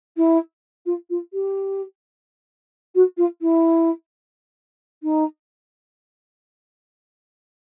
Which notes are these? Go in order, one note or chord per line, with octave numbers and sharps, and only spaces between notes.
E4
F4
F4
G4
F#4
F4
E4
D#4